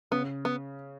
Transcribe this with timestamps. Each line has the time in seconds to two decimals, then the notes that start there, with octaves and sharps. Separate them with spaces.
0.11 C#3 B3
0.45 B3